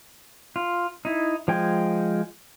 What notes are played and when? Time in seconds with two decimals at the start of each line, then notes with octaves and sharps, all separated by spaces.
0.56 F4
1.05 D#4 E4
1.48 F3 G#3 G5 G#5